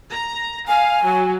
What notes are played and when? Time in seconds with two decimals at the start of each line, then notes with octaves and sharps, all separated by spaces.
0.11 A#5
0.68 F5 G#5
1.04 F#3